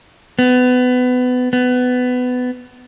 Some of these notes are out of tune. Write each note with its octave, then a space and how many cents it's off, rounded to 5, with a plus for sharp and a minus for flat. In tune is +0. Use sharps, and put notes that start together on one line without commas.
B3 +25
B3 +20